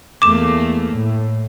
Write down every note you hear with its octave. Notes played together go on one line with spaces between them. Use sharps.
E2 A3 A#3 D6 E7
A2